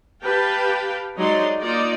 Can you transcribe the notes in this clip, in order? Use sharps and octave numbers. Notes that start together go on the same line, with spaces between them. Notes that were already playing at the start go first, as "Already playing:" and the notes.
G4 B4 F5 G5 A5
F#3 G#3 D#4 D5 C6
A#3 D#4 F4 D5 D#5